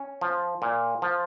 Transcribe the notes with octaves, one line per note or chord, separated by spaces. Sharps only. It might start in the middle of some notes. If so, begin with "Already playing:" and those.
Already playing: C#4
F3
A#2
F3